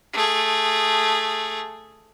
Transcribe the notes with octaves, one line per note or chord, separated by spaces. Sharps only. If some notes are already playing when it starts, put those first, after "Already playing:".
A3 G#4